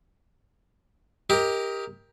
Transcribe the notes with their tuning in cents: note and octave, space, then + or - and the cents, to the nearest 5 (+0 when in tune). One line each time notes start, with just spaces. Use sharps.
G4 +15 A#4 +0 D#5 +25